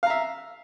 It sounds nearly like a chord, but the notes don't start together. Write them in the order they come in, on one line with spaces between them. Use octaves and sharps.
F5 A#5 E5